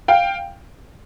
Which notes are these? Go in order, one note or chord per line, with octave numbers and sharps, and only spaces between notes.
F5 G5